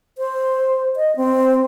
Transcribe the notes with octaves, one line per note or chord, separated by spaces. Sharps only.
C5
D#5
C4